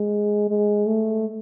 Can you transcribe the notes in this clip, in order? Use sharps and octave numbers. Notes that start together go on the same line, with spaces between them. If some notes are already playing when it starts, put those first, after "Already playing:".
Already playing: G#3
G#3
A3